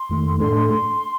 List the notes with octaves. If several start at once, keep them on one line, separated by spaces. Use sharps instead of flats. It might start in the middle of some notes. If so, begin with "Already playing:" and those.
Already playing: C6
F2 D#3 A3
A2 A3 D4 A4 C6
C6
C6